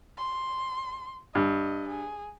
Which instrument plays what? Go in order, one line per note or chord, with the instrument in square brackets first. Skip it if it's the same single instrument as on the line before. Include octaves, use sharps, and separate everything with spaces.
[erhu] C6
[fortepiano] G2 [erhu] D#5
[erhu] G#4